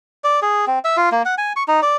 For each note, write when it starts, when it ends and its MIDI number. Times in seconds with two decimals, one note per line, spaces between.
0.24 0.40 74
0.42 0.65 68
0.67 0.79 60
0.85 0.97 76
0.97 1.09 65
1.12 1.22 58
1.25 1.35 78
1.38 1.53 80
1.56 1.63 85
1.68 1.80 63
1.82 1.97 74